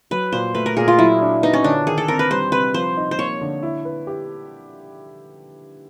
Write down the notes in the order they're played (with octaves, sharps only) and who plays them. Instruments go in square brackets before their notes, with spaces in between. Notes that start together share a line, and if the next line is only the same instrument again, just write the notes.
[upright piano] F#3 [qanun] B4
[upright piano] A#2 [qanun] C5
[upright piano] A3 [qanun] B4
[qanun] A#4
[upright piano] A#2 [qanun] G#4
[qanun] F4
[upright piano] F#3 [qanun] E4
[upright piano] D4
[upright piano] B3 [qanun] D#4
[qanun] C#4
[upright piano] D3 [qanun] D4
[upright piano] D#3 [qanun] G#4
[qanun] A4
[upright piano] C4 [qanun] A#4
[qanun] B4
[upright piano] G3 [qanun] C5
[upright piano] C3 [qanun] B4
[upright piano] F3 [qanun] C5
[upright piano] D#4
[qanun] C5
[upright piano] A#3 [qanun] C#5
[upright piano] D3
E4
B4
G4